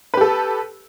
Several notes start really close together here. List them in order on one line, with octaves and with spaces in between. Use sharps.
B4 G4 A4